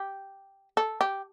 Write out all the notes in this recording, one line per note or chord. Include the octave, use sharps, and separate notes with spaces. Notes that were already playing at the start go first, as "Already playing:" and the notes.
Already playing: G4
A4
G4